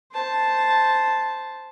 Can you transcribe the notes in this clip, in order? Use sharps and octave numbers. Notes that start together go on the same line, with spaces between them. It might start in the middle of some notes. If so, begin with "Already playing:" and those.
C5 A5